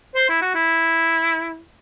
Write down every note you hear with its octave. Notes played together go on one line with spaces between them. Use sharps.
C5
E4
F#4
E4